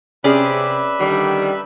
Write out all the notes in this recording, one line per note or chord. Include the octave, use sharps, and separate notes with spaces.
C3 C#4 G#4 B4 D5 E5 B5
D3 D#3 G3